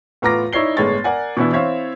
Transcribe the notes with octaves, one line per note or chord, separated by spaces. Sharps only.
A2 B3 F4 A#5 D6 A#6
D#4 E4 C#5 D5 C7 G7
G1 A2 G#3 C#5 C#6 A6
A#4 D5 F#5 G#5
B2 E3 B3 D4 E4
C4 E4 C5 C#5 E5 F5